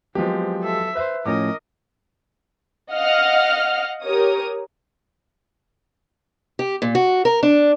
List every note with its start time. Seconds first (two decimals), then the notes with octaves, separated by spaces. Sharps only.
0.15 F3 F#3 G#3 B3 C4 G4
0.61 A4 E5
0.95 B4 C5 E5
1.26 A2 F3 C#4 A#4 D#5 D6
2.92 D#5 F5 F#5 F6
4.03 G4 A#4 C#5 D#6
6.59 G4
6.82 A#2
6.95 F#4
7.25 A#4
7.43 D4